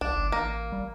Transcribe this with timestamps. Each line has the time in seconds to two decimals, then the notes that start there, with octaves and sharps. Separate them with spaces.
0.01 B1 D4
0.14 G1
0.32 A1 A#3
0.72 G3